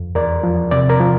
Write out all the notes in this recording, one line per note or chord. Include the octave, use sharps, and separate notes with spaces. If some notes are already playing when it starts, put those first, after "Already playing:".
Already playing: F2
E2 A#4 D5
F3
C3 D5
A#4 D5
F3